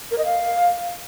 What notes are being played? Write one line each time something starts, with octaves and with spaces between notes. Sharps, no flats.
A#4
D#5
F5